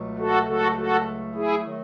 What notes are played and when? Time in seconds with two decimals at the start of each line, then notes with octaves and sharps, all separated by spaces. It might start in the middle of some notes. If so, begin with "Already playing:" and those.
Already playing: C#2 B2 F#3 A3
0.18 F#4 A4
0.47 C#2 C#3 F#3 A3 F#4 A4
0.77 F#4 A4
1.35 E4 G#4
1.65 D#3 F#3 A3